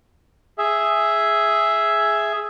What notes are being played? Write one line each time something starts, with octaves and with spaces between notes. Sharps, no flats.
G#4 E5